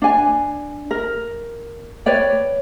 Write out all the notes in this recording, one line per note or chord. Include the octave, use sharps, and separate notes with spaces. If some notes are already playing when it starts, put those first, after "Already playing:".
D4 G#5
A#4
B4 C#5 D5 G5